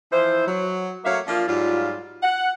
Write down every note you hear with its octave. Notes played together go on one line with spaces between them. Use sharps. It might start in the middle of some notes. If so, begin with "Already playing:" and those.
E3 F3 E4 C5
F#3
F#3 A3 A#3 C#5 E5 F5
F3 A#3 D4 F4
G#2 F#3 G3 F4
F#5